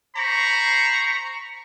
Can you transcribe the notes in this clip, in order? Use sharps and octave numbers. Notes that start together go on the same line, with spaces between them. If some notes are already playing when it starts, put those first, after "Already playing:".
C5 A#5 B5 C#6